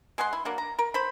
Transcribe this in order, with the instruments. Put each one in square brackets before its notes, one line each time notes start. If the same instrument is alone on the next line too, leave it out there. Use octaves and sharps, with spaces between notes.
[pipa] G#3 G#4 F#5 C6
E4
F#3 A#3 D4
A#5
A#4
C5 B5